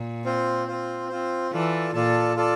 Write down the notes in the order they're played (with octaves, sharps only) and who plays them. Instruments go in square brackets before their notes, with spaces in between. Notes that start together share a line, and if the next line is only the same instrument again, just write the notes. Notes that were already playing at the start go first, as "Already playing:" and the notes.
Already playing: [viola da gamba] A#2
[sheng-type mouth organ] C4 F4 C5
C4 F4 C5
C4 F4 C5
[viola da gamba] E3 [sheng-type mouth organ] F4 A4 D5 A5
[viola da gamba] A#2 [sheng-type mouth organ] F4 A4 D5 A5
[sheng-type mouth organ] F4 A4 D5 A5